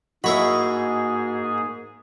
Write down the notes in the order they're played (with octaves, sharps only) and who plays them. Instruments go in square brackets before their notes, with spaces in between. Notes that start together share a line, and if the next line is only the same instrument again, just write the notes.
[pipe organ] G#2 G#4 [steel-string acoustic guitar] A#3 D#5 [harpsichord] E4 C#5 B5 [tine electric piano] F#4